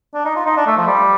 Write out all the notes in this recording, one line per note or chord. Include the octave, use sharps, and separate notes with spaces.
D4
D#4
F4
D#4
D4
A3
F3
G3